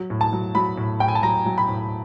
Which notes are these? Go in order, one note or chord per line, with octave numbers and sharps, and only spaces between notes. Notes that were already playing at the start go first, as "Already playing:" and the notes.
Already playing: F#3
A2
A5
F#3
F#3 B5
A2
A2 G5
G#5
A5
F#3 A#5
F#3
B5
A2